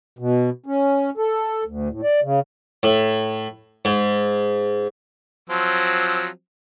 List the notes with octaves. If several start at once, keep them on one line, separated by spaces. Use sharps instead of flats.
B2
C#4
A4
D2
A2
D5
C#3
A2
G#2
F3 F#3 C4